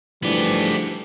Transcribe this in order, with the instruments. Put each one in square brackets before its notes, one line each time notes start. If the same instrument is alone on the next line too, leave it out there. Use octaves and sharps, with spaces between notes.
[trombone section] G#2 E3 D4 [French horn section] F3 G3 A3 [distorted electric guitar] B3 G4